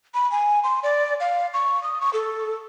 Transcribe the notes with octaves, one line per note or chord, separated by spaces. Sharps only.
B5
G#5
C6
D5
F5
C#6
D#6
C#6
A4